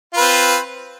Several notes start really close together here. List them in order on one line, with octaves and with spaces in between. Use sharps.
F4 B4 C4